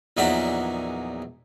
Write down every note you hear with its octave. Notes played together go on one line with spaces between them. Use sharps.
A#1 E2 F#3 D#4 D5 E5